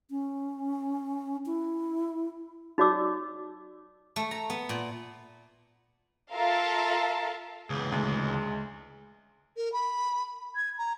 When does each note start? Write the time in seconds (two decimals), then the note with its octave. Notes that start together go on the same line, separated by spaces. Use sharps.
0.10 C#4
1.46 E4
2.78 D#4 F#4 C#5 D5 D6 E6
4.16 A3
4.31 A#5
4.50 B3
4.69 A#2
6.33 F4 A4 A#4 E5 F5 A5
7.70 C#2 E3 B3 G#4 B4
7.92 D2 G#3
9.57 A#4
9.72 B5
10.55 G#6
10.78 A#5